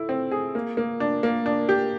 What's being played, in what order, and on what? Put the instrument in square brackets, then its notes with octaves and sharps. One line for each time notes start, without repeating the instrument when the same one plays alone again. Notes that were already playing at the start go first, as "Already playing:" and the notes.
Already playing: [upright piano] A3 E4
C4
G#4
A#3
A#3
D4
A#3
D4
G4